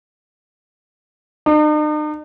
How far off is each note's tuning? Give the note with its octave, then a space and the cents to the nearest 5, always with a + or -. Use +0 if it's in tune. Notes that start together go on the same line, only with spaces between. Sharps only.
D#4 -45